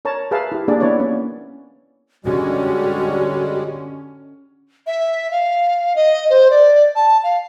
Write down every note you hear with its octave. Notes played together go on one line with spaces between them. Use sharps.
A#4 C#5 A5 A#5
G#4 A#4 B4 E5 F5 A5
E4 G4
A#3 D4 G4 G#4 D5
B3 E4 B4 C#5 D5
A#3 C#4
D3 G3 G#3 C#4 F#4
E5
F5
D#5
C5
D5
A5
F5